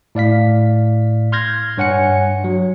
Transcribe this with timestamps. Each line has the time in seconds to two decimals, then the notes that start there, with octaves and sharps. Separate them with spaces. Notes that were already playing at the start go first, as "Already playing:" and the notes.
0.15 A2 D5 F5 B6
1.32 C6 F6 G6 G#6 A#6
1.77 G2 C#5 F#5 G#5 C#7
2.44 F#3